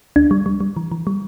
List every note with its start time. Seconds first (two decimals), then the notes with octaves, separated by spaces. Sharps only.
0.16 D2 D4
0.31 G3
0.46 G3
0.61 G3
0.77 E3
0.92 E3
1.07 G3